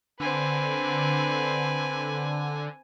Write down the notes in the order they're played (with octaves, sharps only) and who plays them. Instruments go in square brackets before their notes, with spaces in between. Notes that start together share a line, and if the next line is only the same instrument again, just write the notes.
[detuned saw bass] D3 [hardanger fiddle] C4 B4 [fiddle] G#5